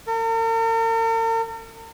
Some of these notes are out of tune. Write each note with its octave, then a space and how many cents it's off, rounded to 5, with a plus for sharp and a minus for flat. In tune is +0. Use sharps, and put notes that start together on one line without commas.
A#4 -45